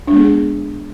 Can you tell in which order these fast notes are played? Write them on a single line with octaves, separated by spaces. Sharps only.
D4 G#3 B3 G#4